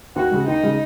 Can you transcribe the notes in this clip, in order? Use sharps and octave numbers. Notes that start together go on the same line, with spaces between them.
D#2 F#4
C#3 G#3
D#2 D#4
C#3 G#3